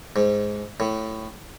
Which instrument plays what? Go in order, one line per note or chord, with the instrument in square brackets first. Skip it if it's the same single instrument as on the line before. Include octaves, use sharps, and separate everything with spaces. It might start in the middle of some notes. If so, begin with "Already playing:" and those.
[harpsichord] G#2
A2